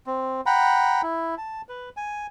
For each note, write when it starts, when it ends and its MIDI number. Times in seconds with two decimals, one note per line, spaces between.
0.07 0.41 60
0.46 1.02 78
0.46 1.02 79
0.46 1.02 82
0.46 1.02 83
1.03 1.35 64
1.38 1.62 81
1.69 1.89 71
1.97 2.27 80